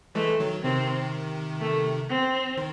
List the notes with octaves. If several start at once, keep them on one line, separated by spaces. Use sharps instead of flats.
E3 G#3 A3
D#3 F#3
C3 D#3 C4
A3
C4
D#3